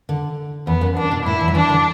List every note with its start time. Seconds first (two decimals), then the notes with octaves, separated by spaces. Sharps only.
0.09 D3
0.67 E2 B3
0.81 F#2
0.96 F#2 D4
1.11 B2
1.25 A2 E4
1.40 E2
1.48 F#3
1.55 E3 D4
1.70 D3